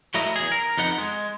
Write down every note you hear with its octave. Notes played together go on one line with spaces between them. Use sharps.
F#3 A3 E4 A#4 D#5
E2 G#4
A#4
F2 B3 D#4 F#5
G#3